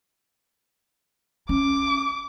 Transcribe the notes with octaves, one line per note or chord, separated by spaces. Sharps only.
C#4 D6